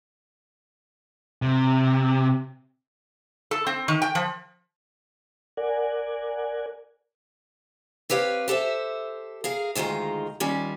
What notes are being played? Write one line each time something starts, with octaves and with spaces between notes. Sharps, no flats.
C3
A4
C4
D#3
G5
F3
A#4 D5 F#5 G#5
C4 G4 B4 C#5 F5
G4 A4 C5 E5
G#4 A#4 F5
D2 D#3 G#3 F4 A#5
D#3 G3 C#4 F4